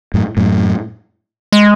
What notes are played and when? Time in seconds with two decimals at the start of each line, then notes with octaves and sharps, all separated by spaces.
0.14 F#2 A2
0.37 F#2 A2
1.52 G#3